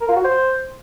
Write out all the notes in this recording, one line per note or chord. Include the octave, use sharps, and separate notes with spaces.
A#4
F4
F#4
C5